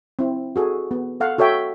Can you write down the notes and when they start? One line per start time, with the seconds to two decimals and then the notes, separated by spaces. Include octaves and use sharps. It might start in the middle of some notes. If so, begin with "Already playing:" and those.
0.19 C4 E4
0.56 F#4 G#4 A4
0.91 B3
1.20 A4 F5 F#5
1.38 F#4 A4 C#5 E5 G5